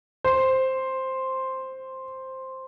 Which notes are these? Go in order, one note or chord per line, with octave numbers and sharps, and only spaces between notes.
C5